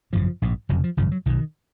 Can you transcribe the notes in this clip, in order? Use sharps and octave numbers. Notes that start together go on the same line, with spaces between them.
G#1 F#2 C#3 F3
A#1 G#2
F1 F2 C#3 F#3
F3
G#1 F#2 C#3 F3
F#3
B1 B2 D#3